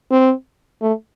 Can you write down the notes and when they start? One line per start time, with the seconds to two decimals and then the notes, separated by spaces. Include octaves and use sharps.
0.11 C4
0.82 A3